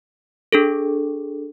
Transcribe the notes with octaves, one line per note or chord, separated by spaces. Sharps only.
D4 G#4 A4